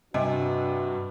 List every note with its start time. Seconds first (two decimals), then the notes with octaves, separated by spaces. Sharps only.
0.14 G2 C3 D4 F#4 B4 D#5 G#5 D6